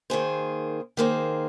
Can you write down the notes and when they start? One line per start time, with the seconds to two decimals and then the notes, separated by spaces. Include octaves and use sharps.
0.10 D#3 A#3 G#4 C5
0.97 D#3 A#3 G#4 C5